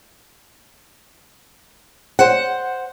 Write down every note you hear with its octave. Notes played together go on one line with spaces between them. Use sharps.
C5 F#5